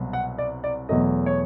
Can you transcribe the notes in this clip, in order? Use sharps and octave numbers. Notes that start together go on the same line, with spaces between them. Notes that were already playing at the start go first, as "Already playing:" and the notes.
Already playing: C2 B2 F#3
F#5
D5
D5
E2 B2 F#3 A3 D#5
C#5